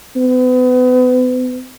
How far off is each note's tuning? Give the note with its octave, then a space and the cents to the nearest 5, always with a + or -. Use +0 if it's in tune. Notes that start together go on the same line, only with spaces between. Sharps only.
B3 +35